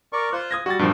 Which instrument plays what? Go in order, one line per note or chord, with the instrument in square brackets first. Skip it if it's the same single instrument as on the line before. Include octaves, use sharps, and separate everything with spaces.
[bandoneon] A#4 D5 C#6
[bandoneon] F4 C5 [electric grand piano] F#6
[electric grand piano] D#6 G#6 A#6
[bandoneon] G3 [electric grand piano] F#4 A6
[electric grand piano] G2 A#2 F3